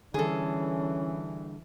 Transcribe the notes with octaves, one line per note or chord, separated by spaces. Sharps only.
D3 E3 G3 C#4 G#4 A4